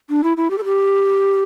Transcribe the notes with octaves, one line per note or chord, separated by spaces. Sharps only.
D4
E4
E4
G4
A4
G4